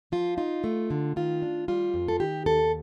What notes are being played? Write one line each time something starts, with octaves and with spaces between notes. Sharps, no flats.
F3 F4
D#4 F4
A3
D3
D#3 F4
D4
G3 F4
F2
A4
D#3 G4
D#2 A4